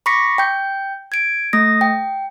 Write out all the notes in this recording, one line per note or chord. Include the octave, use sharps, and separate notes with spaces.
B5 C#6 D6 A#6 B6 C#7
G5 G6
G#6 D7
A3 D#6 A#6
G5